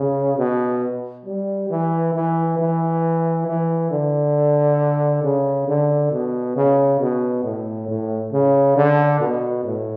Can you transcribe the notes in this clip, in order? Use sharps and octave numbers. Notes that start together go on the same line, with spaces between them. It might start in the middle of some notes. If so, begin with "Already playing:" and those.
Already playing: C#3
B2
G3
E3
E3
E3
E3
D3
C#3
D3
B2
C#3
B2
A2
A2
C#3
D3
B2
A2